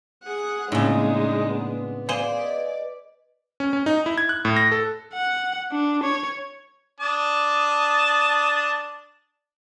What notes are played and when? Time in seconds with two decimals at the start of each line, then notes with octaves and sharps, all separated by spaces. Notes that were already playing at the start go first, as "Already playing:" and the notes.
0.24 G#4 F#5
0.72 A2 C#3 G#3 A#3 C4 D4 D#4
1.51 B3
2.09 G#4 C5 D5 F5
2.39 B4 D#5
3.60 C#4
3.73 C#4
3.86 D#4
4.06 E4
4.18 G#6
4.29 F#6
4.45 A2
4.56 A#6
4.72 A4
5.14 F#5
5.72 D4
6.03 C#5
7.00 D4 A5 D#6